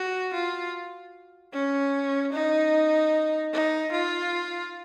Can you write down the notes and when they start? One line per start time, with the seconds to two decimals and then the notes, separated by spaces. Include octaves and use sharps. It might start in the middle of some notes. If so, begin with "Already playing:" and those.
Already playing: F#4
0.34 F4
1.53 C#4
2.33 D#4
3.53 D#4
3.92 F4